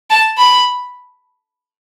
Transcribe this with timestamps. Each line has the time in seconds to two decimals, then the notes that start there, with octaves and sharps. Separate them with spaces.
0.10 A5
0.38 B5